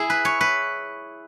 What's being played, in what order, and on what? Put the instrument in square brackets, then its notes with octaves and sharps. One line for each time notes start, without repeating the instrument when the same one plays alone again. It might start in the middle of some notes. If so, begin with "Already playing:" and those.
Already playing: [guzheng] E4 G#4
B4
C#5
B4